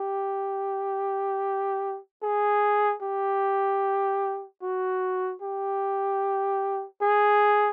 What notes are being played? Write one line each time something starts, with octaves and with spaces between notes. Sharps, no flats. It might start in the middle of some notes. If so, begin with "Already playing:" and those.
Already playing: G4
G#4
G4
F#4
G4
G#4